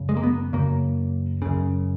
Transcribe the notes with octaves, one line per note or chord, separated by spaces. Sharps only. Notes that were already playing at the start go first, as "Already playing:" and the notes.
Already playing: F#2 C#3
G#3
A#3
B3
F#2 C#3 A#3
F#2 C#3